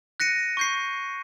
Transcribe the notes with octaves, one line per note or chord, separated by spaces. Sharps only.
F#6 A#6 C#7 D#7
C#6 G6 C7